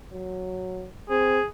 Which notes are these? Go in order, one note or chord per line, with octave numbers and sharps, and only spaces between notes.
F#3
C4 G#4